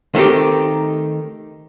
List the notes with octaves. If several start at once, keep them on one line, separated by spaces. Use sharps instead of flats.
D#3 A3 C4 D#4 G4